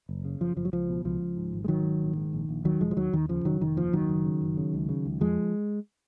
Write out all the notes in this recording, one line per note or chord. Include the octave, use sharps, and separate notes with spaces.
F#1
C#3
F#1 F3
F#1 F3
F#3
C#2 F3
B2
C#2 F3
C#2
G#2
G#1
G#3
G#2 D#3 F#3
G#1
A#1
G#2
A#1
A#1
D#2 D#3 F#3
F1 F3 G#3
F3
D#2 D#3 F#3
D#2 D#3
C#3 F3
F1 D#3 F#3
F1 D#3
D#2 F3
F#1 D#3 F#3
F#1
C#3
F#1
C#3
C#2
C#3
C#2
F2 F3 G#3